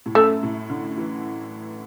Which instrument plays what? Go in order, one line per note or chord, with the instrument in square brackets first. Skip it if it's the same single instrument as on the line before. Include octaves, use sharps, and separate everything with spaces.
[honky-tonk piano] A2
[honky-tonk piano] F#2 [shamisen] A3
[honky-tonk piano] A2
D3
E3